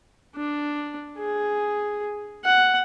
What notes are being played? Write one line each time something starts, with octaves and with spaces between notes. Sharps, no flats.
D4
G#4
F#5